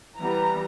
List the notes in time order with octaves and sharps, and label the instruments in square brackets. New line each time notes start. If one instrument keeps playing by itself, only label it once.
[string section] E3 G3 B3 A#5